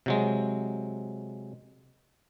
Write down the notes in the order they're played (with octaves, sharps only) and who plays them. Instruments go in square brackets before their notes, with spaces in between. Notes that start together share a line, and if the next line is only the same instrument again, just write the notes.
[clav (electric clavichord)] C3 F#3 G#3